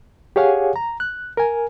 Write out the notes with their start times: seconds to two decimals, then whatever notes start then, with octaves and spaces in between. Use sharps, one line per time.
0.36 G4 G#4 C#5 F5 F#5 G#5
0.76 A#5
1.00 F#6
1.37 A#4 G#5